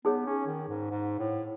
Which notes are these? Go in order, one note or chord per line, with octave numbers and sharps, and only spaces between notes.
B3 D#4 G#4 C#5
C#4
D#3
G#2
G#2
A2